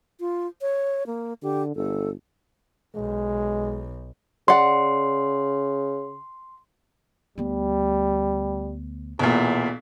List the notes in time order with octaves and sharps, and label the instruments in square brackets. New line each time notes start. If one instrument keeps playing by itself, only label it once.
[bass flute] F4
C#5
A#3
[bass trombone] D3 [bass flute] G4
[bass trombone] G1 [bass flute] A4
[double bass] B1 [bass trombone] G#3
[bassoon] C#3 [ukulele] D5 F#5 [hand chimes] C6
[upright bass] D2 B3 [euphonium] G3
[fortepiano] B1 A#2 [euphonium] E2